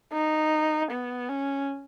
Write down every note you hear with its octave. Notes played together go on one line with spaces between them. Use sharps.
D#4
B3
C#4